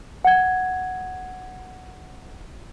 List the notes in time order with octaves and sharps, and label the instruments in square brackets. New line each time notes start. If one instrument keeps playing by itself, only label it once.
[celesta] F#5 G#6